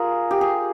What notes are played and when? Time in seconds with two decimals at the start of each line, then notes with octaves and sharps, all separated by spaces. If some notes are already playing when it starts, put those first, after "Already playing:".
Already playing: F4 G#4 A#4
0.31 G4
0.41 G#4